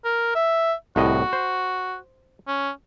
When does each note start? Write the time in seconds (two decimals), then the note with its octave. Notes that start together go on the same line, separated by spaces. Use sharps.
0.05 A#4
0.35 E5
0.96 C2 A2 F#4 D#5
1.33 C5
2.47 C#4